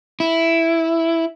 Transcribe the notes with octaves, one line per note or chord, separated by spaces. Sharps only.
E4